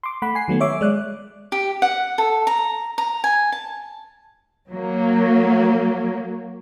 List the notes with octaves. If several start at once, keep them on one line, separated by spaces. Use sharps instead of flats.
C6 D6
A3 F#5 B5
G#5 C7
D#3 F#3 A3 B3
C#5 E5 D6
G#3 D5 F#6
G4
F#5
A4
A#5
A#5
G#5
A5
F#3 A#3